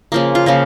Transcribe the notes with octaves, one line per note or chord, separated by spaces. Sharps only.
C#3 F3 A#3
F4
C#3 F3 A#3